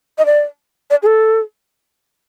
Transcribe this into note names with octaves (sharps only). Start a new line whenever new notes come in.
D#5
D5
D5
G#4
A4